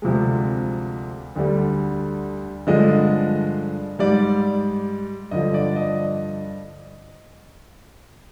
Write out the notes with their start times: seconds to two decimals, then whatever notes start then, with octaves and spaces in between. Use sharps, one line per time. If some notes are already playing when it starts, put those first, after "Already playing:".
0.02 D2 C3 F3 G#3
1.36 D2 D3 G3
2.67 G2 D3 F3 G#3 D#5
3.99 G#2 G3 D5
5.31 G2 D3 F3 D#5
5.54 D5
5.76 D#5